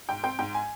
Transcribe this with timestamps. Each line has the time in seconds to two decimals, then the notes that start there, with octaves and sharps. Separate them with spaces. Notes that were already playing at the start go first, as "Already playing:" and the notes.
0.09 G#2 G5
0.23 C4 G5
0.39 G#2 G5
0.54 G#5